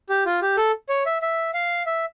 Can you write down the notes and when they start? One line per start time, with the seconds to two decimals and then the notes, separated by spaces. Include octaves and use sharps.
0.09 G4
0.26 F4
0.42 G4
0.57 A4
0.89 C#5
1.06 E5
1.22 E5
1.54 F5
1.86 E5